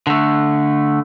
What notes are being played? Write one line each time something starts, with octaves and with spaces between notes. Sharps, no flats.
D3 A3